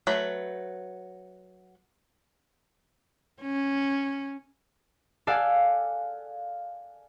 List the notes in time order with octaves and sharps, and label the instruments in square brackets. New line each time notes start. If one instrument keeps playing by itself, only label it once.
[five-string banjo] F#3 A3 B4
[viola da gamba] C#4
[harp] A4 D5 F5 F#5 G#5